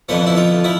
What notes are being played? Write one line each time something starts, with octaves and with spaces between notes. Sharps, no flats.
F2 D3 F3 B3
E4
F4
F3 E4